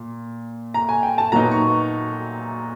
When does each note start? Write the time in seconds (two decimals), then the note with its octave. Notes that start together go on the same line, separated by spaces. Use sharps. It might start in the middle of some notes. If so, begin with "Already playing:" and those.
Already playing: A#2
0.74 A#5
0.89 G#5
1.03 G5
1.18 A5
1.32 A#2 F#3 B3 D#4 A#5
1.51 C#6